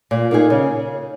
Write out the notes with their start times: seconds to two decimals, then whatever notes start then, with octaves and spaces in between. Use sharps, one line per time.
0.11 A#2
0.31 A#3 D#4 G#4
0.50 C#3